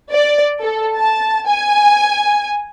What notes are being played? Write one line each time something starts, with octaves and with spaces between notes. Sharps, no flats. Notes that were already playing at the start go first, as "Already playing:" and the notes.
D5
A4
A5
G#5